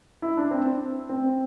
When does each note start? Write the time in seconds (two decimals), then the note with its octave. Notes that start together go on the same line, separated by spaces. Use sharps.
0.22 E4
0.37 D4
0.51 C4
1.09 C4